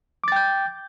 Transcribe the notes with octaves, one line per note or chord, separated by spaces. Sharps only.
G5 D6 G6 A6